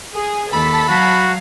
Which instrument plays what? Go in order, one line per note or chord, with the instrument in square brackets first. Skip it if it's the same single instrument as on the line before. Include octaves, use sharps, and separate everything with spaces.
[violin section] G#4
[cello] D#2 [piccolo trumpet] A4 [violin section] A5 B6 [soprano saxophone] B5
[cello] F#3 F5 [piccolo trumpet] F#4